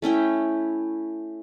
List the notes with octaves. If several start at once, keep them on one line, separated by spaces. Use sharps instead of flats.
A3 C#4 E4 G5